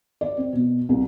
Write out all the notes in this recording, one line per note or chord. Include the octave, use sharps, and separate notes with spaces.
D5
C4
B2
C2